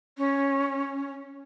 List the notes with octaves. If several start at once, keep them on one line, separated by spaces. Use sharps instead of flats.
C#4